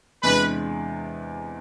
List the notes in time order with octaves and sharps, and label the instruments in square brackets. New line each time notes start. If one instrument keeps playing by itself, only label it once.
[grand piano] E2 C3 G#3 D4 [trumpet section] B4